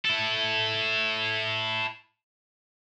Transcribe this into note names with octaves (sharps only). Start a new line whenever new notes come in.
E4 A4